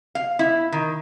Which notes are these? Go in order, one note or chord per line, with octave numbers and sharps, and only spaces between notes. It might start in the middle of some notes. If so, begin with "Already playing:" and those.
F5
E4
D#3